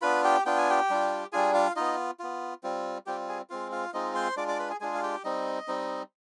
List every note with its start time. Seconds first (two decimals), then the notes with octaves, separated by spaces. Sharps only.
0.02 B3 D4 F4 B4 B5
0.24 G4 G5
0.46 B3 D4 F4 G5
0.58 G#5
0.70 G4 G5
0.90 G3 D4 F4
1.32 G3 D4 F4 G#4 G#5
1.54 F4 F5
1.76 B3 D#4 F4 D#5
2.20 B3 F4
2.63 G3 C4 F4
3.06 G3 C4 F4 G4 G5
3.29 G#4 G#5
3.50 G#3 C4 F4 F5
3.72 F4 F5
3.93 G#3 C4 D#4 F4 D#5
4.15 C5 C6
4.37 G#3 D4 F4 D5 D6
4.48 D5 D6
4.59 B4 B5
4.70 G#4 G#5
4.80 G#3 D4 F4 G#4 G#5
4.95 F5
5.03 G4 G5
5.24 G3 C4 D#4 D#5
5.68 G3 C4 D#4